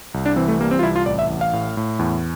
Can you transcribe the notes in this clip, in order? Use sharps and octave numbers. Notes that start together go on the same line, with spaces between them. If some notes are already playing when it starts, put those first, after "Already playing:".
C2
D4
E3 C4
A3
G3 A#3
C4
F4
C2 E4
F4
A1 D5
E5
A1
F5
A2
A2
E2